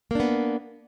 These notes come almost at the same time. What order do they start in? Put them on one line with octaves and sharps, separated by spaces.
A#3 D4 B3